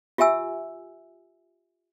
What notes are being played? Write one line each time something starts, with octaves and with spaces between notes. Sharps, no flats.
F4 G4 E5 G#5 E6